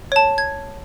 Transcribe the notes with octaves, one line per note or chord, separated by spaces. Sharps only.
C#5 A5
G#6